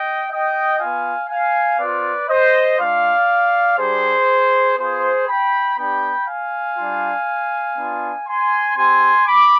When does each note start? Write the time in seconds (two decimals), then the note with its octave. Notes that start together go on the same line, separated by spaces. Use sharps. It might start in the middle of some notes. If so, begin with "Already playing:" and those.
Already playing: D#5 G5
0.30 D#5 G5
0.79 B3 F4 F5 G#5
1.29 F5 G#5
1.79 C4 F4 B4 D5
2.29 C5 D#5
2.79 G#3 D4 F4 D5 F5
3.79 G3 D4 G4 G#4 C5
4.78 B3 F4 G#4 C5
5.28 G5 B5
5.78 B3 D4 G4 G5 B5
6.28 F5 G#5
6.78 G3 D4 F4
7.77 B3 D4 F4
8.27 G#5 C6
8.77 C4 G4 G#5 C6
9.26 B5 D6